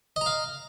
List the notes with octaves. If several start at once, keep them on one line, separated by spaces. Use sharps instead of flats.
D#5 F5 A#5